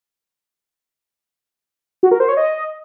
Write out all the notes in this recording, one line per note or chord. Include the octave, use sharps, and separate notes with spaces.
F#4
A#4
C5
C#5
D#5